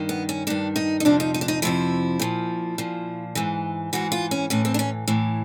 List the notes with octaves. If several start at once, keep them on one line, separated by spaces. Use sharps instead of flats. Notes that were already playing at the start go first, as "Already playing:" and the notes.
Already playing: G2 D#3
B3
C#4
G2 D#3 D4
D#4
D#4
F2 C3 F3 D4
D#4
D#4
D4
D#4
F2 C3 F3 E4
A#2 F3
A#2 F3
G#2 E3
G#2 E3 F#4
F4
C#4
A2 E3 C#4
C4
D4
C#4
A2 E3